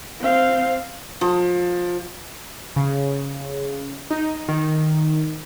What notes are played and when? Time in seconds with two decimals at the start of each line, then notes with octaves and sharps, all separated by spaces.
0.20 C4 F5
1.21 F3
2.76 C#3
4.11 D#4
4.48 D#3